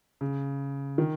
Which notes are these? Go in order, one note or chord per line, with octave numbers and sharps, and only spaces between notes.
C#3
D#3